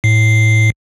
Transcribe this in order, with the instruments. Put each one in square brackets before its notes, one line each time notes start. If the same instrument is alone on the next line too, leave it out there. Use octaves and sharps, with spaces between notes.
[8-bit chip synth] A2 C7